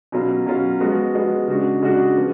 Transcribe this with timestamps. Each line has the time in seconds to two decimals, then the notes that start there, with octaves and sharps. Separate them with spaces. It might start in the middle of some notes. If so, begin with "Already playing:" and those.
0.12 B2 F#3 C#4 F4
0.46 B2 F#3 C#4 F4
0.80 F3 G#3 B3 F#4
1.14 F3 G#3 B3 F#4
1.47 C#3 G#3 D4 F#4
1.82 C#3 G#3 D4 F#4
2.16 F3 B3